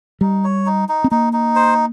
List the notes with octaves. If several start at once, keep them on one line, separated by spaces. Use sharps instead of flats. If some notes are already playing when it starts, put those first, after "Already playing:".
G3 D#4
C#5
D#4
D#4
C4
A#3 D#4
D#4
C5